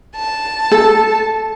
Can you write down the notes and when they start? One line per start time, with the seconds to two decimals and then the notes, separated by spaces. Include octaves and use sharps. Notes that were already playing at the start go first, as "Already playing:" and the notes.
0.16 A5
0.72 A4